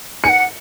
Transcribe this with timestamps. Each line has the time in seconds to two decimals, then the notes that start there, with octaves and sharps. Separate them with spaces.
0.24 G#5 C#7
0.29 F#5